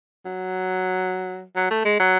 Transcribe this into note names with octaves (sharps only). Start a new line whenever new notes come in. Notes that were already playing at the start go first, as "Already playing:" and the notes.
F#3
F#3
A3
G#3
F#3